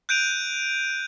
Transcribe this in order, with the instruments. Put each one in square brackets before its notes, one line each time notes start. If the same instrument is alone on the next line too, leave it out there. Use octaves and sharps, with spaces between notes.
[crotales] F#6 G6 D7 D#7 F7